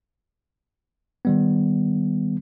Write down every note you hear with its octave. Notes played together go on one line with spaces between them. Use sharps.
D#3 G3 B3